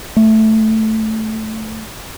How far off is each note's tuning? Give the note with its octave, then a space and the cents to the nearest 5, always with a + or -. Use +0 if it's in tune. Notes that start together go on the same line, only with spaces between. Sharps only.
A3 -5